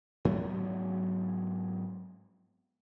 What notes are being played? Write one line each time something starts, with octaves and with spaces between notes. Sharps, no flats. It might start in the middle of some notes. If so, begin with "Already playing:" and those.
G#2 F#3 A3 B3